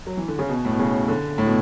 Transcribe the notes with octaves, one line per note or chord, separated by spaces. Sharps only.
F#3
E3
D3
C#3
B2
A2
B2
C#3
D3
A2
B2